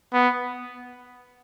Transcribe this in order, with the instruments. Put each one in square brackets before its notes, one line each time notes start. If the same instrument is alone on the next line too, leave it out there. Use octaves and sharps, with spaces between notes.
[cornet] B3